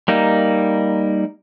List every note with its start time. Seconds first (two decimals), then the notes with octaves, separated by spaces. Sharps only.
0.08 G3 A#3 D#4